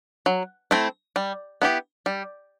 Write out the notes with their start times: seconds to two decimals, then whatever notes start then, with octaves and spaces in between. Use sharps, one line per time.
0.26 F#3
0.71 A3 C4 E4
1.16 G3
1.62 B3 E4 G4
2.06 G3